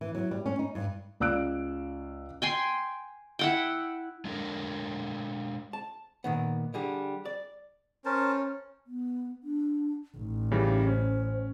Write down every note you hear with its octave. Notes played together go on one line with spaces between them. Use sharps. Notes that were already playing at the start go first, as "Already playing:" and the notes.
E3
F#3
G3
C#4
D#4
G2
C#2 D5 F5 E6 F#6 D7
G5 G#5 C6
E4 F#5 G5
G#3 D4 A4 A#4
A5
A#2 D#3 B3
D3 G3 G#4
D5
C#4 A#4 C5 A5
B3
D4
A1 D#4
C#3 E3 G3
C#4 C5